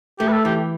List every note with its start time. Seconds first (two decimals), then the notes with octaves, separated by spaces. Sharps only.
0.19 A3 G4
0.28 B4
0.32 A4
0.45 E3 G4